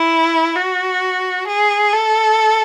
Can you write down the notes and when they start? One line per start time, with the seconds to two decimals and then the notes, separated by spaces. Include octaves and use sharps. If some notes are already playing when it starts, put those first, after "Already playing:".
Already playing: E4
0.56 F#4
1.47 G#4
1.93 A4